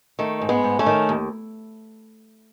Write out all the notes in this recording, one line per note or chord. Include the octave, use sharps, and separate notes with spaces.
D#3 A3
G#2
G#3 B3
G#2
A3 C#4
D#3
D#2